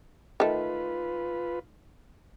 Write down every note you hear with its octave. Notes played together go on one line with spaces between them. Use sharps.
D#3 A3 F4 B4